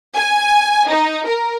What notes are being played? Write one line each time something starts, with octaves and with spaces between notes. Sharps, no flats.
G#5
D#4
A#4